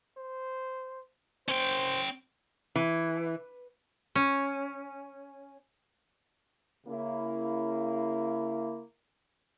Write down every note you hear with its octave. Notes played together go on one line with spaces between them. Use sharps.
C5
C#4 C5 G5
E3
C#4
C#3 A#3 E4